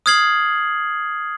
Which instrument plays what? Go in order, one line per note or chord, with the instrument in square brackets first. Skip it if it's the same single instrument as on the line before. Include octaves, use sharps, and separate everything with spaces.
[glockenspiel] D#6 F6 G#6 C7 F#7